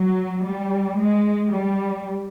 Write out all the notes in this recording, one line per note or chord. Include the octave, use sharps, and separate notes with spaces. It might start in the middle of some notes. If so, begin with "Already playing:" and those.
Already playing: F#3
G3
G#3
G3